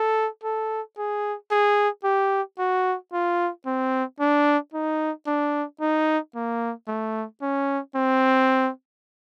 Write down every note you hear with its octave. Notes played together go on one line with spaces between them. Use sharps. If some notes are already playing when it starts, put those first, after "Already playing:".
Already playing: A4
A4
G#4
G#4
G4
F#4
F4
C4
D4
D#4
D4
D#4
A#3
A3
C#4
C4